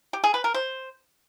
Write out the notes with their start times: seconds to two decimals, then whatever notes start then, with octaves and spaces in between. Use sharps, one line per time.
0.13 G4
0.24 G#4
0.34 B4
0.44 A#4
0.54 C5